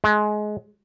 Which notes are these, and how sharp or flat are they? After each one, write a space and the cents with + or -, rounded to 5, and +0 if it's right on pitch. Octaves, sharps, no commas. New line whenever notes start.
G#3 +20